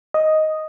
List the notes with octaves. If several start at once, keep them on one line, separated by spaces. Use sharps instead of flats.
D#5